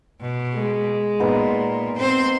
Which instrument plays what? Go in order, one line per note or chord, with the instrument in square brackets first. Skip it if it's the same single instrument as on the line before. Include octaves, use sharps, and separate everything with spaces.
[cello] B2
[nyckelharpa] G#3
[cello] A#2 [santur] B3 D#4 A#4
[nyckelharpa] C4 [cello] C5